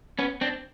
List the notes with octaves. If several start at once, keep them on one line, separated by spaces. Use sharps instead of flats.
B3 C#4
C4 D4